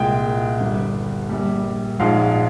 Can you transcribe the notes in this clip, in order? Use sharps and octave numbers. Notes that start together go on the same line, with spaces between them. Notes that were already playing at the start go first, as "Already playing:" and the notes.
Already playing: C2 A#2 G#3 G5
G1 G2 G3
A#1 A#2 G3
A#1 G#2 F3 G#3 F5